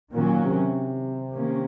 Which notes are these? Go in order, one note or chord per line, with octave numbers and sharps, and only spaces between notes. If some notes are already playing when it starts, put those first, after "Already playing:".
A#2 D#3 F#3 A#3 C#4
C3
D#3 A#3 C#4